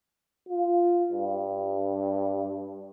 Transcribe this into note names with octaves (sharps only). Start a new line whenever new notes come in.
F4
G2